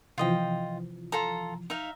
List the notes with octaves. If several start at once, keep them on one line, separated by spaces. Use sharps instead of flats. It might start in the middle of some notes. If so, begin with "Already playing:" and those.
C3 E3 F3 F4 D#5 G5
F4 A4 A#5
D#4 E5 F5